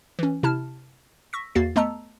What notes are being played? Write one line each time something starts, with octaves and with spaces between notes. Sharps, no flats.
E3 C#4
C3 E4 A5 F6
C#6 E6 A#6 B6
E2 A#3 F#4 A6 C7
A3 B3 D#5 A5 A#5 E6